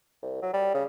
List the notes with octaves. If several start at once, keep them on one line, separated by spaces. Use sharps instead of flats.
C2
F#3
G3
C#3